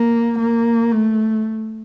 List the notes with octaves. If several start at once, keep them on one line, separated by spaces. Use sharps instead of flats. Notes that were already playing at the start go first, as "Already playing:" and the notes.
Already playing: A#3
A#3
A3